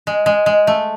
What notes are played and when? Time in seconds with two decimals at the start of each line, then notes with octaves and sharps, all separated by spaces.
0.07 G#3
0.26 G#3
0.46 G#3
0.67 A3